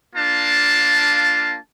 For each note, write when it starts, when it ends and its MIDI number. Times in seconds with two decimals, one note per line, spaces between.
0.15 1.58 58
0.15 1.58 62
0.15 1.58 65
0.15 1.58 81